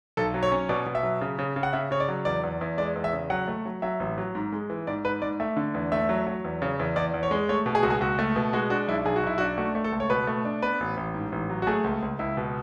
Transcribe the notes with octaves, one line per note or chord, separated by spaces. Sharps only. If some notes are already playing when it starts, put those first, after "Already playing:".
B1 A4
F#3
C#5
C#4
B2 D5
B2
E5
F#3
C#3
C#3
C#3
F#5
C#3 E5
C#3 C#5
D5
F#3
E2 D5
E2
E2
G#3 D5
E2
E5
C#3
F#3 F#5
A3
F#3
F#3 E5
A1
F#3
G#2
G#3
E3
G#2 D5
G#2 B4
G#2 D5
A3 E5
D3
E2
A3 E5
F#3
F#3
E2
C#3
E2
E2 D5
E2
C#5
G#3
A3 C#5
B2
G#4
C#2 F#4
G#4
C#2 F#4
A3
B2
G#3 F#4
D4 F#4
B1 E4
B1 G#4
F#4
B1 E4
F#4
D4
A3 F#4
A3
A4
C#2
C#5
B2 B4
A3
D4
B3 B4
A1
A1
G#2
A1
F#3
F#4
A3 G#4
C#2
C#2
C#2 E4
B2